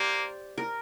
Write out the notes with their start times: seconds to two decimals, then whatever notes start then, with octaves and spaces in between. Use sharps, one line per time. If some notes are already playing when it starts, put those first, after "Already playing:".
Already playing: A#3 G4 C5 D5
0.58 A#4